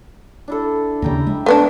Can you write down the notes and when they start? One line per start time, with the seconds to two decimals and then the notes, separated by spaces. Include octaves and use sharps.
0.48 D4 E4 A4
1.02 D#2 C#3 G3 G5 A#5
1.27 G#3 E5
1.46 A3 B3 D4